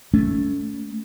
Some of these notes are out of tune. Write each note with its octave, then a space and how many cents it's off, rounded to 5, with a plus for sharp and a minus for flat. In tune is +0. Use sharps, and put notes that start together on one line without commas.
A3 +0 C#4 +30